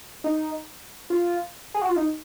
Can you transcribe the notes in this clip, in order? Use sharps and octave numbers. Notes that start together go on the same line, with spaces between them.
D#4
F4
G#4
F#4
F4
D#4